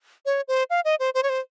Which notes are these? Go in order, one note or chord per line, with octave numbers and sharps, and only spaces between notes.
C#5
C5
F5
D#5
C5
C5
C#5
C5